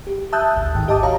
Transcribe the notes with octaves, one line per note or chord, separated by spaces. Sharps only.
G4
E5 A5 D#6 E6 F#6 G6
G#1 D2
G#1 G#2 D#3 G5
G4 D#5 G5 A5 D6 D#6
F#4 C#5 F5 A#5